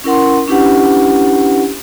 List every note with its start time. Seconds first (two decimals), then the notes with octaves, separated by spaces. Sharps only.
0.04 C#4 E4 A#4 F#5 C6
0.48 C#4 D4 E4 G4 B4 F#5